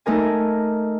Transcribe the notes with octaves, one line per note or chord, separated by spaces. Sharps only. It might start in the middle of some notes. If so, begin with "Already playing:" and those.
A3 D#4 A#4 G#5